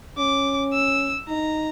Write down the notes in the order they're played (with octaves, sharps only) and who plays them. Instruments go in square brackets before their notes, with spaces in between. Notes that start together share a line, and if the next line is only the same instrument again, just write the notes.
[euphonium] C#4 [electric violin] D6
[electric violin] E6
[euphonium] D#4 [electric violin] A#5